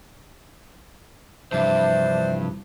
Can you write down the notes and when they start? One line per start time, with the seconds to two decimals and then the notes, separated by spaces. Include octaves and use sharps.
1.52 G2 C3 E3 F3 D4 C5 E5